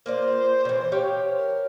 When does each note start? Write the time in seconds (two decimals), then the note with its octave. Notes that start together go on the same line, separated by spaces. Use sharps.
0.06 A#3 F4 C5 D5
0.65 C#3 E3
0.92 G4 C#5 F5
1.35 A#4